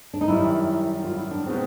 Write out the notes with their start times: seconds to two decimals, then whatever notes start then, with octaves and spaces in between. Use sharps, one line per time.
0.14 D4
0.21 D#4
0.28 F#2 D#3 G3 E4
1.04 F4
1.16 E4
1.31 D4
1.46 B2 G#3 B3 C4 D#4